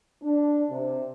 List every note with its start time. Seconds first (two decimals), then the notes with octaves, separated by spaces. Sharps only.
0.21 D4
0.69 C3